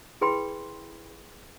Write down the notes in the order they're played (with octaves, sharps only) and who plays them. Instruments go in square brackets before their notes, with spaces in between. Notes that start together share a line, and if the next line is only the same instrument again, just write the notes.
[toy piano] E4 G#4 B4 G5 B5 C6